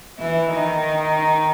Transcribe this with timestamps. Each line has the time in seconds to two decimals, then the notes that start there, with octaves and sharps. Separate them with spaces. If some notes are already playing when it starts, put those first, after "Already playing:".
0.19 E3 E4
0.51 D#3 D#4